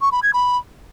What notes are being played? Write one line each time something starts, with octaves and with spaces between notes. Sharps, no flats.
C#6
B5
G#6
B5